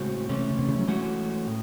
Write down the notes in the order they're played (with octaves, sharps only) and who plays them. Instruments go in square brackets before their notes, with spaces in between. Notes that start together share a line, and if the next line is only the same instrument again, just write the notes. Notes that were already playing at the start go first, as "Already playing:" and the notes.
Already playing: [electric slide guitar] A2 G#3 C4 F#4 [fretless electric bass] C#3
[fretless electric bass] C3 [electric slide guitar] E3 A3 C#4
[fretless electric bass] C#3
C3
C#3
F#3
[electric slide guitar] E3 A3 C#4 F#4 [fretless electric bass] G#3
[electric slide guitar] A2